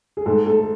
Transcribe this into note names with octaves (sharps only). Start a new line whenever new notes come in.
G#4
G#2 A3 A4
A3 A4
A3